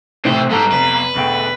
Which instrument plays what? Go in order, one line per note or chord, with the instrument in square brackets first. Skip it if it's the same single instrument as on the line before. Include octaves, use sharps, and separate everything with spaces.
[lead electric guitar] D2 C5 [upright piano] A2 E3 C4 [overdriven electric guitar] C3
[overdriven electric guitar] G#2 G3 [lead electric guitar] B3 A#5 [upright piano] A4
[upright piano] F1 [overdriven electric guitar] B4
[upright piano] E1 G5 [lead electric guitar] D2